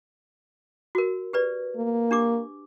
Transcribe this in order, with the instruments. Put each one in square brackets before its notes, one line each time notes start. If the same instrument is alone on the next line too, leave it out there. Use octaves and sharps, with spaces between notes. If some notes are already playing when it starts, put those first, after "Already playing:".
[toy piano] F#4 A#4
G4 B4 D5
[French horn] A#3
[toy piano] D4 G4 D6